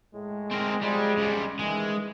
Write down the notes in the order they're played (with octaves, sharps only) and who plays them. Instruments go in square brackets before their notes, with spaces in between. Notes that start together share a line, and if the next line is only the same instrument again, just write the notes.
[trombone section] A2 G#3
[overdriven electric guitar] C4 A#4
[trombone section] F3 G#3 [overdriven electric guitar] G3
[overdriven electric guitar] C#3 G3
[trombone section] D#3 E3 [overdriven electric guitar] G#3